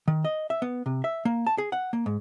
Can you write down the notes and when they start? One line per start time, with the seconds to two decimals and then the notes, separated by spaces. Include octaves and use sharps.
0.08 D#3
0.25 D#5
0.50 E5
0.62 B3
0.86 C3
1.04 E5
1.25 A#3
1.47 A5
1.58 G#4
1.72 F#5
1.93 A#3
2.06 G#2